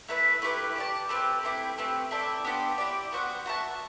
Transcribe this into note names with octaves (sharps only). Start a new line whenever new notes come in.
A3 E4 B4 E5
A3 E4 G4 B4
G4 D5 A5
A3 C4 G4 B4
A3 C4 E4 G4
A3 C4 G4 B4
C4 E4 A4 D5
B3 D4 G4 C5
E4 G4 D5
B3 F#4 C5 F#5
F#4 B4 E5 A5